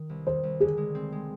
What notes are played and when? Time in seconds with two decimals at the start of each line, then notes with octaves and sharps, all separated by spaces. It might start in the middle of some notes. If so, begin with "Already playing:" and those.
Already playing: D#3
0.09 C2
0.26 D#3 C5
0.43 C2
0.60 D3 G#4
0.78 G#3
0.95 C4
1.12 G#3